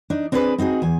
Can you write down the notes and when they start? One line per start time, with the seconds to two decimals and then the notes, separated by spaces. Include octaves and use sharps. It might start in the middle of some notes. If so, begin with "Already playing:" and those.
0.10 D4 D#4
0.32 C4 D4 G#4 A4 B4
0.58 C4 D#4 F#4 G#4
0.82 E2 G#5